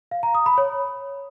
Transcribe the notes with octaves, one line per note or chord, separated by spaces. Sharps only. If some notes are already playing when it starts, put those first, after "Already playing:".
F5
A#5
D#6
B5
C#5